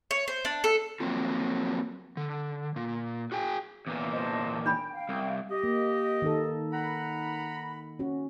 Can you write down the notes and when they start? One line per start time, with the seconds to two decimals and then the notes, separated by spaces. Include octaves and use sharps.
0.11 C#5
0.28 C5
0.45 D4
0.64 A4
1.00 F3 F#3 G#3 A#3 C4 F4
2.17 D3
2.76 A#2
3.32 F#4 G#4 G5 G#5
3.87 E2 A#2
4.11 C5 D#5 A5
4.66 D4 G5 B5
4.93 F5 G5
5.09 C2
5.50 G4 D#5
5.64 A#3
6.22 D#3 D#4 A4
6.72 F#5 A#5 B5
7.99 C#4 F#4